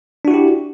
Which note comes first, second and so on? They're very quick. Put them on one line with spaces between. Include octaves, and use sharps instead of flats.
D4 F#4 E4 G4